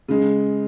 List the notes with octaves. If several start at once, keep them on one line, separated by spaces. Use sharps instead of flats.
C#3 G#3